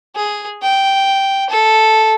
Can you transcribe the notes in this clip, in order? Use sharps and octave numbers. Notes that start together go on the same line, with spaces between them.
G#4
G5
A4